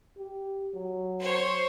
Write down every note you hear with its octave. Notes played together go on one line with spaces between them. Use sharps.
G4
F#3
C5 C#5